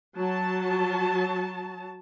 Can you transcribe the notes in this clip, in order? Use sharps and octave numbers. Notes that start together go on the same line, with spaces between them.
F#3 A5